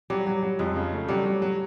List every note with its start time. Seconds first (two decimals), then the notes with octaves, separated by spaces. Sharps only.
0.10 F#3 G3
0.27 F#3
0.43 F#3
0.59 F2 G#3
0.76 C#3
0.93 A3
1.08 F#3 G3
1.26 F#3
1.42 F#3